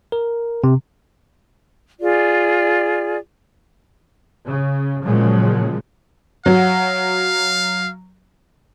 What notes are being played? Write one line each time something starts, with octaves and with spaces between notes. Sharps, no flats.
A#4
C3
F4 G#4 D5
C#3
A#2 C#3 F3 F#3 G#3
F#3 F5